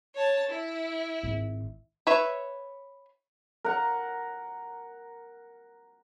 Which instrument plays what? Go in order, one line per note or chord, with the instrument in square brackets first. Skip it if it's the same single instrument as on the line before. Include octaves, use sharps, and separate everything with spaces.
[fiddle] C#5 A5
E4
[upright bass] G#1
[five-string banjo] B4 C#5 E5
[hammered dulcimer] A#4 F#5